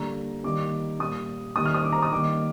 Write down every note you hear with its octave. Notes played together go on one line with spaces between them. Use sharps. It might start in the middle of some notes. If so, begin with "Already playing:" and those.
Already playing: D3 G3 A#3 A#5
D#3 G3 A#3 D6
A#2 G3 A#3 D#6
D#3 G3 A#3 D#6
F6
D#6
D6
A#5
D#6
D#3 G3 A#3 D6